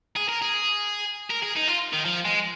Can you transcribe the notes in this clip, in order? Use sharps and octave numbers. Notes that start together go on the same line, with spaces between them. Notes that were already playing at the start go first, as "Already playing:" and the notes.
G#4
A#4
G#4
A#4
G#4
D#4
F4
D#3
F3
G#3